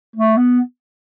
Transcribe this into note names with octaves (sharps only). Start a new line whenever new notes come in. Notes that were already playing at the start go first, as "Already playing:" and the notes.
A3
B3